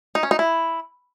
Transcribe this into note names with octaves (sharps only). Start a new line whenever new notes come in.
D#4
C#4
D#4
E4